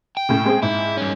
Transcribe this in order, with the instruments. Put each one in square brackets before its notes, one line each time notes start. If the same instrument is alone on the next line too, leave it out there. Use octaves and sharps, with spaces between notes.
[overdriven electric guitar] G5
[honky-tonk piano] A2 C#3
G#3 C4 G#4
[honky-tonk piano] G#2 [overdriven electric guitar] E4
[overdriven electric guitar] G2 C#4